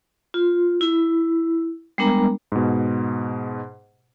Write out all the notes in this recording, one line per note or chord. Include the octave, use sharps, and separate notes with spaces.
F4
E4
G3 G#3 B3 D4 A#4 A#5
G#2 B2